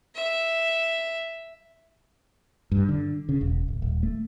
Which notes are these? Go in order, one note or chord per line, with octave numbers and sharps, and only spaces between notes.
E5
G2
D3
C#3
E1
D1
D#1
A3